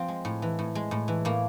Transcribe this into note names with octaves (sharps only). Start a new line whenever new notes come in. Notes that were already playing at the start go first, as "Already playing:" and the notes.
Already playing: F3 C4
G#3
A2
E3
A2
G#3
A2
E3
A2 A#3